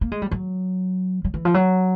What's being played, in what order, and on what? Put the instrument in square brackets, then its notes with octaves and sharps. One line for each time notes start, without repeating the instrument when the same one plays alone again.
[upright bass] A#3
G#3
G3
F#3
F#3
E3
F3
F#3